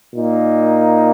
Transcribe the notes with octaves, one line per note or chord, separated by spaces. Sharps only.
A#2 A#3 D#4